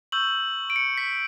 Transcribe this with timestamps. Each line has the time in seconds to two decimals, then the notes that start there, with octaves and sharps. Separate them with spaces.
0.12 C#6 E6 G6 F#7
0.70 D7
0.76 C#7
0.97 B6